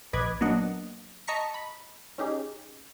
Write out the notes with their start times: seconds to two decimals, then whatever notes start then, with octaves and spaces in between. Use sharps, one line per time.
0.13 A#1 B4 D#5 B5 D6 G#6
0.41 F#3 A#3 B3 D4 D#5 F#5
1.27 D#5 A5 A#5 C#6 B6 C#7
1.54 B5
2.18 C#4 D#4 G4 G#4